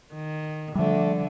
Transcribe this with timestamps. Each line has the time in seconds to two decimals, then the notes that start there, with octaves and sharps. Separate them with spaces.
0.13 D#3
0.75 D3 F3 G3 A3